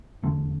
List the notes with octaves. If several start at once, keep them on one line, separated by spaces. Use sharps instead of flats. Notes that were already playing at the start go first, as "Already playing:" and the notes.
F1 E2 D3 A3